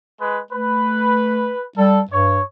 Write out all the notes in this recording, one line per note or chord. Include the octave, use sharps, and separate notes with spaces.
G#3 B4
A3 B4
G3 A4
G2 C#5